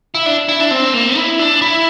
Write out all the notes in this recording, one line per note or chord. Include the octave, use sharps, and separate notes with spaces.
E4
D4
E4
D4
C4
A#3
E4
D4
E4